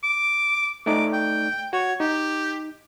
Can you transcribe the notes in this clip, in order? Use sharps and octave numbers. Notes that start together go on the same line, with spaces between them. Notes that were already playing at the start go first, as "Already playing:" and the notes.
D6
A3 D#4 D5 D6
G5
F#4 C#5
D#4 G4